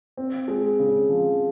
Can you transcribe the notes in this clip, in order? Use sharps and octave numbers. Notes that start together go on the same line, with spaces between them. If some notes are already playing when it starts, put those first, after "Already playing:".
C4
G#3
C#3
F3